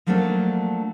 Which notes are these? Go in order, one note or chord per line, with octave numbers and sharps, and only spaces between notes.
F3 F#3 A3 A#3 C#4 D4